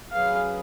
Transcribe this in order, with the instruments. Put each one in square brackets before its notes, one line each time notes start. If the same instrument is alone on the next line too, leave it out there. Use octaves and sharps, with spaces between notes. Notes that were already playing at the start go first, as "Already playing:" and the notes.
[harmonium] F#3 C#4 G#4 B4 [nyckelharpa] F5